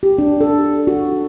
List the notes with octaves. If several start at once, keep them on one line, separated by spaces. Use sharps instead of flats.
G4
D4
A4
F#4